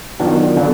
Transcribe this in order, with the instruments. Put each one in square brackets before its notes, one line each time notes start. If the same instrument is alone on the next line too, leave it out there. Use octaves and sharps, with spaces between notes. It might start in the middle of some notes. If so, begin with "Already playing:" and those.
[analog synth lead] D#3 [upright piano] F#3 B3 D4 F4
[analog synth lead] D3 [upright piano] F#3 B3 D4 F4